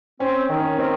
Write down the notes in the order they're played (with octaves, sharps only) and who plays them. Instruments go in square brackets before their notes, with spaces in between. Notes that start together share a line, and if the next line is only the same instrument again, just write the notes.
[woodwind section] C4 [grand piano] C#4
[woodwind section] D#3
[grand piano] C#4
[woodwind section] D#3 [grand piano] C4